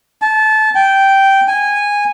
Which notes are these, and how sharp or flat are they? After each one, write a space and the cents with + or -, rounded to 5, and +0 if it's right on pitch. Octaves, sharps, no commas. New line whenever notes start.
A5 -20
G5 -10
G#5 -15